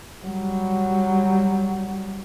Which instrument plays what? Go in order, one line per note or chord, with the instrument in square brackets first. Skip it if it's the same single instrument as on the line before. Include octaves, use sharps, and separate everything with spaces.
[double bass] F#3 G3